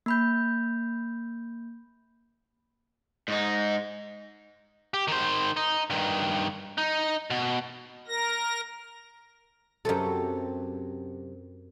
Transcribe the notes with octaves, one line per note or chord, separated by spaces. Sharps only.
A#3 B5 G6
G#2 D#4
G4
D#3 C5
D#4
G2 D#3
D#4
B2
A#4 A#6
F#2 C3 F#3 A4